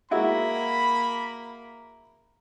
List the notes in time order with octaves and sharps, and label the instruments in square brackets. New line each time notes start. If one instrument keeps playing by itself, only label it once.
[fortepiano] G#3 E4 F#4 [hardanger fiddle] A#3 [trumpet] B5